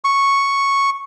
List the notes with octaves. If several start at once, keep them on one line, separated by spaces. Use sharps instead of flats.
C#6